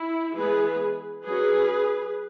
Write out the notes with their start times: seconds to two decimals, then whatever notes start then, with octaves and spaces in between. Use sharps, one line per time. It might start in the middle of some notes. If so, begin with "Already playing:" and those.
Already playing: E4
0.36 E3 G#3 B3 G#4 B4
1.25 F#3 C#4 G#4 B4